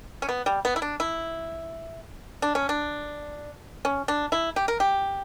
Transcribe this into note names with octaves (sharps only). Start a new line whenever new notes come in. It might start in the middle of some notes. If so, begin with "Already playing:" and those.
C#4
B3
G3
B3
E4
D4
E4
D4
C#4
D4
C#4
D4
E4
G4
A#4
G4